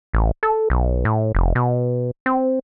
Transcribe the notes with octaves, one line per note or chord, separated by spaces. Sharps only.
A1
A4
B1
A2
F1
B2
C4